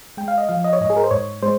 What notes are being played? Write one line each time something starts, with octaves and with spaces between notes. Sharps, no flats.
G#3 G5
F5
D#5
F3 F5
D#5
C#5
G#2 D#5
G#4
A#4
C5
G#2 C#5
G#3 C5